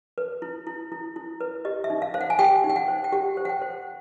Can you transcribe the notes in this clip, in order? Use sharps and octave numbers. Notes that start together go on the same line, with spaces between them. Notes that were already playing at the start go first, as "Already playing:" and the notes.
B4
E4
E4
E4
E4
B4
G4 D#5
E5
D#4
F5
C5 F5
F#5
G#5
G4 G5
D#4
G5
F#5
C5
G5
G4 F#5
C5
F#5
G5
C5